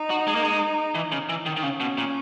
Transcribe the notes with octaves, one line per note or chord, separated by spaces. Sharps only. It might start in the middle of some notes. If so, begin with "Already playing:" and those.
Already playing: D#4
F#4
G#3
A#3
G#3
E3
C#3
E3
D#3
D#3
C#3 C#4
B2
A#2